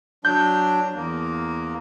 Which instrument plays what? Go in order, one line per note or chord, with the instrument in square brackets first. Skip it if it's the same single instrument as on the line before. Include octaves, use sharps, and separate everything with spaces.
[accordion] F#3 D4 [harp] G6
[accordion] E2 A#3